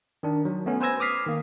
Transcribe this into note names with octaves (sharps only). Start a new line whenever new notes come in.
D#3 D4
F#3
A3 B3 C#4
B4 C5 G#5 E6 G#6 A#6
D6 D#6 F6 B6 C7
D#3 A#3